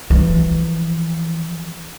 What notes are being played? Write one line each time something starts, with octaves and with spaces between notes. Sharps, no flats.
E3 F3